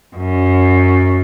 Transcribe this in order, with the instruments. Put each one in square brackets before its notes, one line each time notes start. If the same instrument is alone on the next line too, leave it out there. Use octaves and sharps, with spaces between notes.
[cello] F#2